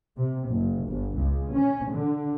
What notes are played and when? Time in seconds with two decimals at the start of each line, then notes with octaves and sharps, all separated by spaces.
0.17 C3
0.48 F#1
0.86 G1
1.16 C#2
1.52 C#4
1.90 D3